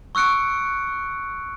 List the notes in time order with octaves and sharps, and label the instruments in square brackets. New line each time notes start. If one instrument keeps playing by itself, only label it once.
[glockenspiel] C#6 E6 F#6 C#7 D7